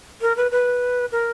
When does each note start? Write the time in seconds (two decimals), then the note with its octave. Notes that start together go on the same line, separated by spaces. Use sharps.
0.21 A#4
0.37 B4
0.51 B4
1.12 A#4